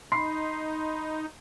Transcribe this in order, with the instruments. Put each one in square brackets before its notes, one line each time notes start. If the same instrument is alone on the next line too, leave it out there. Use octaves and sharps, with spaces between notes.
[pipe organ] D#4 [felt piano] B5 C6 C7